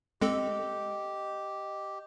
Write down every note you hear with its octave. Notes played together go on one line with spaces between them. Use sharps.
G#3 C4 G4 A4 D#5